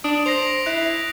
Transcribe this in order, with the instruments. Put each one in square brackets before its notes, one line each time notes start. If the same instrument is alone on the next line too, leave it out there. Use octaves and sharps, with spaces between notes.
[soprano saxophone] D4 [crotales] D#6 D7
[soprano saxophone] C5 [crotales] A#6 C7 F7
[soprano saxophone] E4 [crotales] F#6